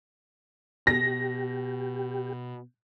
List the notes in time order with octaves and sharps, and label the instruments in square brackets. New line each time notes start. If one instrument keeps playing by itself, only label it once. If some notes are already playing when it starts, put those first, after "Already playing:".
[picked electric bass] B2 [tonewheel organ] G4 [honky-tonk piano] A#6